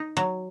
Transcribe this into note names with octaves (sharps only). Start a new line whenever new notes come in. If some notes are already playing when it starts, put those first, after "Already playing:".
Already playing: D#4
F#3